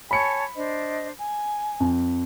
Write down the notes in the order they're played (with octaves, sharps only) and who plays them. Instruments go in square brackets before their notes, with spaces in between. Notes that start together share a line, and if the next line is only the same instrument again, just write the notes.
[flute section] C#5 G#5 A5 [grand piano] B5 C#7
[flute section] D4 C5 D#5
G#5
[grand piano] F2